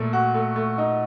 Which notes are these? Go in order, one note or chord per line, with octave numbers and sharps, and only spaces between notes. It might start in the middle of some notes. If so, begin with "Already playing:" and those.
Already playing: A#2 A3
F#4
A3
A3
D#4